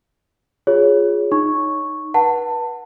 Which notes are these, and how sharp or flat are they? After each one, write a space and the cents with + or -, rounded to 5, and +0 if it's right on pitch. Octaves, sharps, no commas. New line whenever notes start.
F4 +15 G#4 +0 C#5 +5
D#4 +0 C#6 -5
B4 -30 F#5 +0 A5 +20